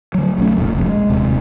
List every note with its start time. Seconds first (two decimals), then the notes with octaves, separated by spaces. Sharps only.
0.14 D3 F#3
0.38 B1 A3 C#4
0.56 F1 A#2
0.73 F1 A#1 C3
0.86 G#3
1.10 D#1 C3